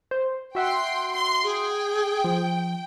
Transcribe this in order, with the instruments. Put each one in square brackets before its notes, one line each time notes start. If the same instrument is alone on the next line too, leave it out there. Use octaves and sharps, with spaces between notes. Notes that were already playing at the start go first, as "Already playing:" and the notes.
[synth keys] C5
[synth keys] F#4 E5 F#5 [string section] G5 C6
[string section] C6
[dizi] G#4 [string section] G5
[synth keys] F3